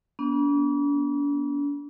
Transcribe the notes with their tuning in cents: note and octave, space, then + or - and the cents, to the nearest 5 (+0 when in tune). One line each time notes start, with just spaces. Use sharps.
B3 -45 D4 -40